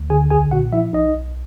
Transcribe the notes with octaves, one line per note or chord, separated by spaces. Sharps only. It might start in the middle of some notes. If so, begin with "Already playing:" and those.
Already playing: D2
D3 G#4 G#5
B1 G#4 G#5
A#2 F#4 F#5
F3 E4 E5
B1 D#4 D#5
B1